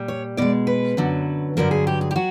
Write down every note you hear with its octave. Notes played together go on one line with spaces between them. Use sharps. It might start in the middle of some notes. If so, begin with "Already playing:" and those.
Already playing: A#2 G3
C#5
B2 G#3 D5
B4
F#2 D3 F#3
G2 D3 F#3 A#4
G#4
G4
G#4
G4
F#3 F#4